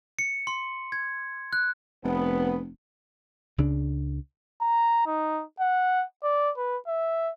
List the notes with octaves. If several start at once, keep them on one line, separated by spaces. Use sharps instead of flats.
C#7
C6
G#6
F#6
F1 B3
C#2 C#3 D4
A#5
D#4
F#5
D5
B4
E5